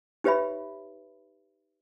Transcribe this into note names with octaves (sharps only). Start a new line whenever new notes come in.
D#4 G4 B4 C#5 E5 B5